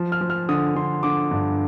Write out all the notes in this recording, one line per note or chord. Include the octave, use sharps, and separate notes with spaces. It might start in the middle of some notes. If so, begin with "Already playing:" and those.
Already playing: F3
F6
F3
F6
D3 D#6
D3 C6
D3 D6
G2